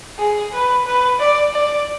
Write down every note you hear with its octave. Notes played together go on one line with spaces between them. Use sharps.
G#4
B4
B4
D5
D5